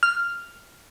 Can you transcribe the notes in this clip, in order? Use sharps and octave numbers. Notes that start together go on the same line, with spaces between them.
F6